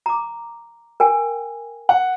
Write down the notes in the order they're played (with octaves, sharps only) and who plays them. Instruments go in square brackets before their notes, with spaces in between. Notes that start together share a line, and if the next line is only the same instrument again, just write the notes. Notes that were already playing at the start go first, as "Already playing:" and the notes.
[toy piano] A#5 D6
A#4 G5 G#5
[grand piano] F#5